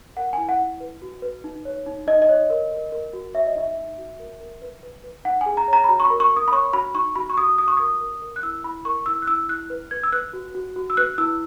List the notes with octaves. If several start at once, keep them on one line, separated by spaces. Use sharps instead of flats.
A#4 F#5
E4 G#5
F#5
E4
B4
F#4
B4
D#4
C#5
D#4
D#4 D#5
D#5
C#5
A#4
A#4
A#4
F#4
C#5 E5
D#5
D#4 E5
D#4
F#4
A#4
A#4
B4
B4
B4
D#4 F#5
G#4 G#5
A#5
C#5 A#5
B5
F#4 A#5
C#6
B5
A#4
C#6
A#4
D#6
B5
C#5 C#6
F#4 B5
D#4 C#6
F#4 B5
C#6
F#4 D#6
F#4 D#6
C#6
A#4 D#6
A#4
A#4
F#6
E4 E6
E4 B5
A#4 C#6
E4 E6
F#6
E4 E6
E4 F#6
B4
B4 G#6
E6
B4 F#6
F#4
F#4
F#4
E6
B4 F#6
E4 E6